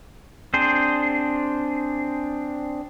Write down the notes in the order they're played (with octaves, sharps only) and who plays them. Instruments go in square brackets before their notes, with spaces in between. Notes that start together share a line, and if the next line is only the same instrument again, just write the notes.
[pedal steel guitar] C4 D4 G#4 C5